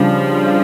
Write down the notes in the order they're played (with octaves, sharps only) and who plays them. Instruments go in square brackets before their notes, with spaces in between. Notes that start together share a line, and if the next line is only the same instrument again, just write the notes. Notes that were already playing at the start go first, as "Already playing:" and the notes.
Already playing: [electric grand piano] C#3 G3 D4 [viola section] F3